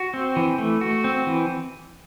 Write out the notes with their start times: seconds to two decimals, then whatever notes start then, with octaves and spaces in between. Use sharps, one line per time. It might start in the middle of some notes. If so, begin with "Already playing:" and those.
Already playing: F#4
0.14 C4
0.36 E3
0.58 A3
0.81 F#4
1.04 C4
1.27 E3